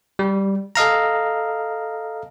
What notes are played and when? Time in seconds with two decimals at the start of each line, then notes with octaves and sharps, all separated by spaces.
0.19 G3
0.75 A4 D#5 F5 A#5